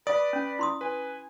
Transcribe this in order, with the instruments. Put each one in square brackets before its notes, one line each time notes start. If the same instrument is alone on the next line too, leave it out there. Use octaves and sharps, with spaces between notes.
[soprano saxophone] B4 [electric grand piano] D5 [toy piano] D#6
[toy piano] C#4
E4 C6 D#6
[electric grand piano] B4 [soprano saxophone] G#5